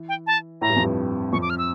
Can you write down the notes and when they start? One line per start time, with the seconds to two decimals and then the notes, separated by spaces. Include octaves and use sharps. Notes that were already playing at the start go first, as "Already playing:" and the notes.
Already playing: E3
0.09 G5
0.27 A5
0.61 A2 A#5
0.69 G2
0.76 F2
0.83 G2
1.33 F2 C#6
1.42 D6
1.50 F6
1.58 E6